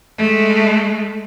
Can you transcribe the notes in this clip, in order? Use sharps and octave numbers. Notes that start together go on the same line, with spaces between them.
G#3 A3